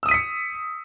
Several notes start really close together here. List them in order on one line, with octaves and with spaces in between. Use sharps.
E6 D#6 D#7 B6 C#7